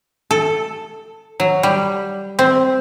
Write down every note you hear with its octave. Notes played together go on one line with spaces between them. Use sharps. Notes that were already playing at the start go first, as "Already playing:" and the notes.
A4
F#3
G3
C4